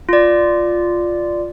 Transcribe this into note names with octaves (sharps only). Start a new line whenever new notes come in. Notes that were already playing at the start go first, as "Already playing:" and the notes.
F4 D5